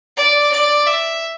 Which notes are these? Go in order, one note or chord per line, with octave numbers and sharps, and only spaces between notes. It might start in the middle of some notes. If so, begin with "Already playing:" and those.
D5
D5
E5